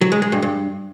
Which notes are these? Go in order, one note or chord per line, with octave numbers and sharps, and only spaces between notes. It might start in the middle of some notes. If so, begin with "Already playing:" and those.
F#3
G#3
G#3
G2
G2